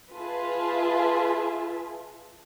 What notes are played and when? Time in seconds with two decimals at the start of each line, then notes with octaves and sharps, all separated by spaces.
0.15 F4 G#4 B4 E5 A5